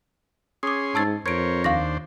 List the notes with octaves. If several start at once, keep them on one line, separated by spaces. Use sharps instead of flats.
C#4 G#4 C6 D6 D#6
G#2 A5 E6 A6
F2 A#4 C5 C#5 G#6 D7
D#2 D4 C5 F5 C#6 A#6